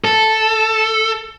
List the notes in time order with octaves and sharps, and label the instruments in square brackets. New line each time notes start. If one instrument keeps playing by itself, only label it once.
[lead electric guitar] A4